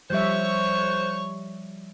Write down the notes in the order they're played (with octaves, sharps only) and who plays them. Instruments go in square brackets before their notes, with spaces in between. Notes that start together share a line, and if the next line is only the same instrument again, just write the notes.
[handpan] F3 G3 E5 [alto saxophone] C5 [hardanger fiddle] C#5 C#6